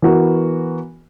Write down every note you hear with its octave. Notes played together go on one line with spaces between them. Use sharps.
E3 B3 F#4 A#4